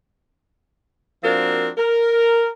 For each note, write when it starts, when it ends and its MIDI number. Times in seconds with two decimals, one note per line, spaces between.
1.23 1.69 53
1.23 1.69 58
1.23 1.69 60
1.23 1.69 62
1.23 1.69 66
1.23 1.69 70
1.77 2.48 70